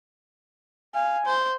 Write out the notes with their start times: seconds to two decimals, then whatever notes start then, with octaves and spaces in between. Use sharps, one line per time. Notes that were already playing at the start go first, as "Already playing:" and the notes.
0.95 F5 G#5
1.26 C5